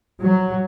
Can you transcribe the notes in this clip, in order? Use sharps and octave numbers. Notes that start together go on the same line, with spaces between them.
F#3